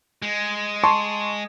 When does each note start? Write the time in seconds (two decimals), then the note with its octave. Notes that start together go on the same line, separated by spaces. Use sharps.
0.22 G#3
0.84 A5 C6 C#6